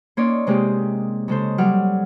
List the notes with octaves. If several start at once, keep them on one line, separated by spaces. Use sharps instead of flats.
A#3 C#4 D#4 C#5 D5 C6
C3 G#3 A#3 D#4 G4 C5
C#3 G#3 A4 C5
F#3 G3 F#5 D6 F6